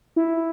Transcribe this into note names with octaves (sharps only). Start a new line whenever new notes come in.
E4